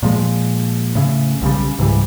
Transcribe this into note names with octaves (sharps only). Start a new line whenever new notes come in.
A#2 F3 G#3
A2 C#3
B1 C#3 G3
C#2 G#2 E3 G3